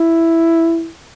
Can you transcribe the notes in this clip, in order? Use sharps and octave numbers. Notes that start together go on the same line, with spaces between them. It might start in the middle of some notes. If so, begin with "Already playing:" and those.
Already playing: E4